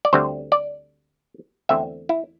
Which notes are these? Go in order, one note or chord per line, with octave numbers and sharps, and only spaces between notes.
D5
D2 D3 G3 C4 C5
D5
E2 D3 A3 C4 E5
E4